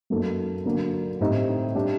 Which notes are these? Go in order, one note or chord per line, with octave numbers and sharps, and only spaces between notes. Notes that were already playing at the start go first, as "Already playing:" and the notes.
F#2 F#3 A#3 D#4 A4
D3 F#3 A#3
A2 G3 C4 D#4
G3 D4 G4